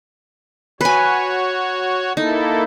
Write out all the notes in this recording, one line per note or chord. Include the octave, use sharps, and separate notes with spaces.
F#4 B4 C#5 G#5
A#3 D#4 E4 A4